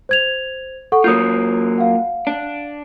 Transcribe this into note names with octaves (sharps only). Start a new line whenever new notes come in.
C5 G#6 F7
A4 F#5 C#6
F#3 A#3 F4 D#6 G6
F5 F#5
D4